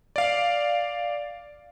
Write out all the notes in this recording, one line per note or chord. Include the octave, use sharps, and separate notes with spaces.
D5 F5